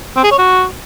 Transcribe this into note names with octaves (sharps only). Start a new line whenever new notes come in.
C4
G#4
C#5
F#4